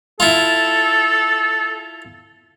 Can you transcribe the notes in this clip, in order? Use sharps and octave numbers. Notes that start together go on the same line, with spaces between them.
E4 F4 A4